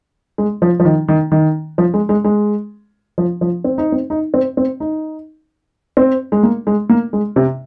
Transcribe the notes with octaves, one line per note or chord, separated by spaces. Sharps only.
G#3
F3
F3
D#3
D#3
D#3
F3
G#3
G#3
G#3
F3
F3
C4
D#4
C4
D#4
C4
C4
D#4
C4
G#3
A#3
G#3
A#3
G#3
C3